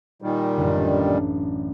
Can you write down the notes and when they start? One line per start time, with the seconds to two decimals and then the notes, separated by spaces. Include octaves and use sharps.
0.22 A#2 D#3 G3
0.57 A1 F#2 D3